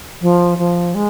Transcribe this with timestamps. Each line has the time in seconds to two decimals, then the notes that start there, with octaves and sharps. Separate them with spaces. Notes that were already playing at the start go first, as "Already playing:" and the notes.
0.22 F3
0.59 F3
0.95 G#3